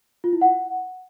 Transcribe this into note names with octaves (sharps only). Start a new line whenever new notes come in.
F4
E4
F#5